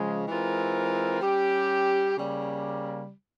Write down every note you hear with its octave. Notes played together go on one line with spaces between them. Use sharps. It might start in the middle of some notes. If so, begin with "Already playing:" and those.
Already playing: C#3 F3 G#3
E3 G#3 C4 F4 A#4
G3 C#4 G4
C#3 G3 A#3